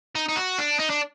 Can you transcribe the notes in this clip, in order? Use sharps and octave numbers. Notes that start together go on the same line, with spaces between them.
D#4
D#4
F#4
D4
D#4
D4